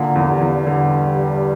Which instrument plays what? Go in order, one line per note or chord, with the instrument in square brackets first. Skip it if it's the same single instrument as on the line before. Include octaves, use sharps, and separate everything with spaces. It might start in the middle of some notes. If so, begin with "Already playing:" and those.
Already playing: [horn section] A#2 A#3 [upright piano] D3
[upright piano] E2
[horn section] G2 G3
[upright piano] E2
D3